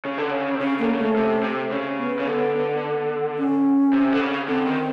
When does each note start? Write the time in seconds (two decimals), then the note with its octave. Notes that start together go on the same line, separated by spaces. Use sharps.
0.05 C#3
0.18 D3
0.31 C#3
0.55 C3
0.60 C#3 C#4
0.79 D3 A#3
0.89 C#3
0.98 A3
1.16 C3
1.43 C3
1.71 C#3
1.98 B3
2.19 C#3
2.27 D3
3.38 C#4
3.93 C3
4.13 D3
4.21 C#3
4.48 D3 C4
4.67 D#3